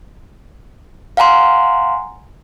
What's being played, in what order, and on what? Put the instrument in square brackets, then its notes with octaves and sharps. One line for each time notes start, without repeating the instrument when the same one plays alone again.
[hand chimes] F5 F#5 G#5 A#5 C6